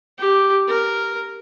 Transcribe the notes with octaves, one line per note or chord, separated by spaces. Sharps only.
G4
A#4